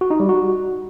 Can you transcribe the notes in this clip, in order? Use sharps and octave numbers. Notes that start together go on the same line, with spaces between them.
F#4
D#4
G3
F#4